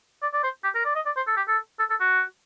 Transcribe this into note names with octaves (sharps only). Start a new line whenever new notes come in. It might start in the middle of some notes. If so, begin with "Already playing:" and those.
D5
D5
C5
G4
A#4
D5
D#5
D5
C5
A4
G4
A4
A4
A4
F#4